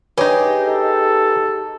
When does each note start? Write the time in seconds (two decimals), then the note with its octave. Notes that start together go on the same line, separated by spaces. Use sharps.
0.18 D#4 G4 G#4 B4 C#5
0.62 A4